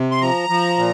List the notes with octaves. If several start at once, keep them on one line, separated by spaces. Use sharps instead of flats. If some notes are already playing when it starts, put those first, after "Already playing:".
Already playing: C3
C6
F3 A#5
F3
A#2